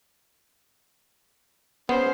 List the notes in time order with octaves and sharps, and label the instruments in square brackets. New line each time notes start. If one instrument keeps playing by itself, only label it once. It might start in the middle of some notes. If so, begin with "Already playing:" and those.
[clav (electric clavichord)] B3 [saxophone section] C#4 G#4 C5